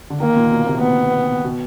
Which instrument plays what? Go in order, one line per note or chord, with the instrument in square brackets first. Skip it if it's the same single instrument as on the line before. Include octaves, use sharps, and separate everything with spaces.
[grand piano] D3
[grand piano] D#3 [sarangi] A#3
[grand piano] A#2
B2
C3
[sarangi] B3
[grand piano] B2